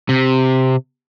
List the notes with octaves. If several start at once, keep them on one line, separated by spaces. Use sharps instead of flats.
C3